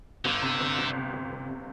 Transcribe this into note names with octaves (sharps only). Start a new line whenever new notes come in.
G1 D3
C3
G1
G1
C3
G1
G1
C3